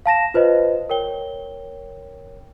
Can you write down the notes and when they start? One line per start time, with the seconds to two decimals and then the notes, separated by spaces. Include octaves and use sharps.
0.06 F5 A5 A#6 E7
0.34 F4 B4 C5 D#5
0.90 A#4 C#5 G5 G7